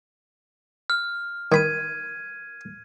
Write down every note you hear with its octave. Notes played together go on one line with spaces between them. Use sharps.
F6
D#3 B5 G#6 D#7